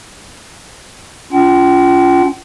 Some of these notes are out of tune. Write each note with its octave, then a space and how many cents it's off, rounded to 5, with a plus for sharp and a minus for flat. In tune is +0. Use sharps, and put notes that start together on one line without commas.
C#4 +40 F4 -10 G5 -45